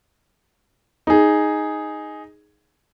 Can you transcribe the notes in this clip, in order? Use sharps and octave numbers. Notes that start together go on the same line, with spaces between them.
D#4 G#4